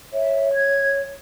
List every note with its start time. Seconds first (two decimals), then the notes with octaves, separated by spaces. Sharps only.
0.13 C#5 E5
0.54 G#6